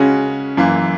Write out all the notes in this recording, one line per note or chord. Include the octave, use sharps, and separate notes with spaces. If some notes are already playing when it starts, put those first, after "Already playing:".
Already playing: C#3 G#3 C#4 F#4
F#2 E3 A#3